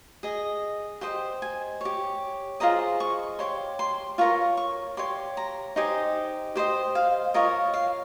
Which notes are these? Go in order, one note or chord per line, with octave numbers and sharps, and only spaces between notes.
G#4 D#5
G4 C5 D#5 G5
G#5
G4 C#5
F4 G#4 C5 D#5 A#5
C#6
G4 C#5 C6
C6
F4 A#4 C#5 C#6
C#6
G4 C#5 C6
A#5
D#4 G4 C5 D#5 G#5
G4 C5 D#5 G5
F5
F4 A#4 C#5 D#5
F5